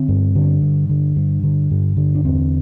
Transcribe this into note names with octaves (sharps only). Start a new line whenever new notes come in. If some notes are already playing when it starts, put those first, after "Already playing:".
Already playing: D3 C4
G2
D3
G2
D3
G2
D3
G2
D3
D4
E2 C4